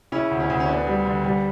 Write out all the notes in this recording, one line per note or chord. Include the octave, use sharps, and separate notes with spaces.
C#3 C#4 E4
D2
C#4 E4
D2
C#4
D3 B3 D4
G3
D3
G3